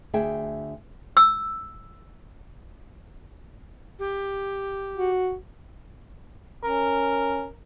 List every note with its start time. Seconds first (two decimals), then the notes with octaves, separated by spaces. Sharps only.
0.14 D2 G#4 E5 G5
1.17 E6
3.99 G4
4.97 F#4
6.63 C#4 A#4